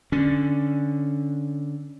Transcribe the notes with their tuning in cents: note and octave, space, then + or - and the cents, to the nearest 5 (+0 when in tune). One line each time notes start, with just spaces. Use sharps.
D3 +0 C#4 +0